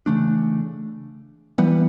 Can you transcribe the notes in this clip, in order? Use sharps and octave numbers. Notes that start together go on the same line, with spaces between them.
C#3 E3 A3 D4
E3 G3 B3